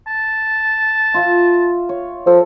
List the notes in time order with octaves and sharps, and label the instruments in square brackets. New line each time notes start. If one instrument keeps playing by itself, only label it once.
[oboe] A5
[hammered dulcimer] F4 E5 F5
C#5
[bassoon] F3 [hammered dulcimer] A4